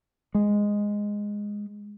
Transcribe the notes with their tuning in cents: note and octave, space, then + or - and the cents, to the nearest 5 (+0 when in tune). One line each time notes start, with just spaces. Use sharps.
G#3 -5